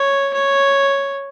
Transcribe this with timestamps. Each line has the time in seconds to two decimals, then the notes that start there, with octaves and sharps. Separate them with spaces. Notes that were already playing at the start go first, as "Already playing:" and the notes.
Already playing: C#5
0.34 C#5